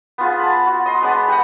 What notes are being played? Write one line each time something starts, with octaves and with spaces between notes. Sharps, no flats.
B3 F4 G#4
A5 B5
F#4
D#5 C6
G#3 B3 D4 B5
G4 B4 D#5 F#5